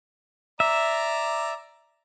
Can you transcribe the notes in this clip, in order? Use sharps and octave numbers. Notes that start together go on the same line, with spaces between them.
D5 E5 A#5